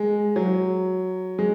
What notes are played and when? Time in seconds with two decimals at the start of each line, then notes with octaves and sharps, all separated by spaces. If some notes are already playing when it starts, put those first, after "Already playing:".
Already playing: G#3
0.36 F#3
1.39 G#3